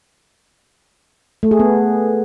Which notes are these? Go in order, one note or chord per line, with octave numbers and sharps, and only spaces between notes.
A3
G#4
B3